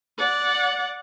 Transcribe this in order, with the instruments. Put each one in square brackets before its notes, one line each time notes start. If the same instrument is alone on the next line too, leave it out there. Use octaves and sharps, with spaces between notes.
[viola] D5 F#5